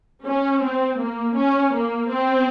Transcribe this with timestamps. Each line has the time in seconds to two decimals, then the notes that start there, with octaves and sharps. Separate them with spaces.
0.24 C#4
0.61 C4
0.98 A#3
1.36 C#4
1.74 A#3
2.11 C4